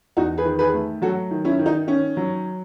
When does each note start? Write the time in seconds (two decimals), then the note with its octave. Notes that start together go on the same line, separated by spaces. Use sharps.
0.17 E2 D#4 F#4
0.38 G#4 B4
0.45 D#3
0.59 G#4 B4
0.73 A3
1.02 F#3 F#4 A4
1.31 D#3
1.45 C#4 E4
1.59 D#3
1.66 D#4
1.87 D#3 C#4
2.17 F#3